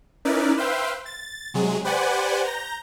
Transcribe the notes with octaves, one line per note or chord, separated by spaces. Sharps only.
C#4 D#4 E4 A#4 B4 D5
B4 C5 E5 F5 G5 C6
A6
C3 F#3 G#3 G#4
G4 B4 C5 D5 F#5 G#5
A#5 G6 A#6